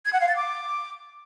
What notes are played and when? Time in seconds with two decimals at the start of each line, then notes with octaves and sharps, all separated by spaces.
0.05 G#6
0.13 F#5
0.20 F5
0.28 A6
0.36 D6